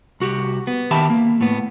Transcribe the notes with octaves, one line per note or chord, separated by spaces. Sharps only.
C2 F#4 G4
B3
D#3 G4 E5 G5 A5 B5
A#3
A2 B3